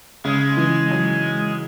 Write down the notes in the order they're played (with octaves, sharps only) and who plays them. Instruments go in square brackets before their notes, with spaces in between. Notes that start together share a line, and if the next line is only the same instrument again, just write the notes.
[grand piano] C#3 [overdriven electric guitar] G#3
[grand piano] E3
F#3